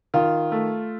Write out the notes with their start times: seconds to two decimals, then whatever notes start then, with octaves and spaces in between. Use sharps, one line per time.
0.14 D#3 F4
0.52 A3